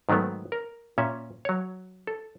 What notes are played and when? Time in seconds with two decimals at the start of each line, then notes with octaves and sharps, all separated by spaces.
0.09 G#2 D#3 F#3 A3 B3
0.52 A#4
0.98 A#2 C#4 E5
1.45 F#3 C#5
2.07 A4